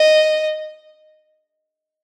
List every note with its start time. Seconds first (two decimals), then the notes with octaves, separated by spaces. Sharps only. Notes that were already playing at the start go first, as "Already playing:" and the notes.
Already playing: D#5